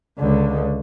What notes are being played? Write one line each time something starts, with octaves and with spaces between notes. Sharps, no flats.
C#2 D3